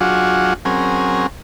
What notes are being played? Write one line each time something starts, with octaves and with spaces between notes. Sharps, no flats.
F#3 D4 F4 F#4 G#4
F#3 C4 C#4 G#4 A#4